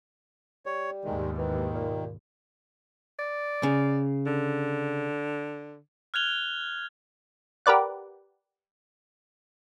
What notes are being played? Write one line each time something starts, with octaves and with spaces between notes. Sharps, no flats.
G3 C#5
D#2 G#2 B2 D#3 G#3
D#3 E3
A#2
D5
C#3
D3
F6 F#6 G#6 F7 G7
G4 A#4 B4 D5 F#5